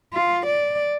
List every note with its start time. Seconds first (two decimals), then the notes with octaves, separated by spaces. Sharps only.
0.14 F4
0.46 D5